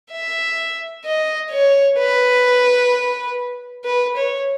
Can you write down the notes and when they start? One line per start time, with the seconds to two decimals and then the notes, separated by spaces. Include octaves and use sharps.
0.11 E5
1.04 D#5
1.51 C#5
1.98 B4
3.84 B4
4.17 C#5